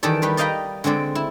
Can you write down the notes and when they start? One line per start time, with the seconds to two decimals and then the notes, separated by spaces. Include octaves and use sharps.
0.03 D#3 E3 G3 A4 D5
0.22 D#3 G3 B4
0.37 D5 D#5 F5 G5 A#5 B5
0.84 D3 G#3 C4 D5
1.15 E4